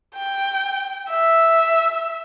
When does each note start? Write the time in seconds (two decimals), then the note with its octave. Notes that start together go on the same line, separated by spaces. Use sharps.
0.16 G5
1.10 E5